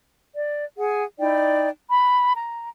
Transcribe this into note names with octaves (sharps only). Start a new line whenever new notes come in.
D5
G#4 F#5
D#4 E4 D5 G5
B5
A#5